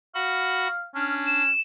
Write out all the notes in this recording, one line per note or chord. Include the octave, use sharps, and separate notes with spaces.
F#4 F5 F#5 B5
C#4 D4 F6
E7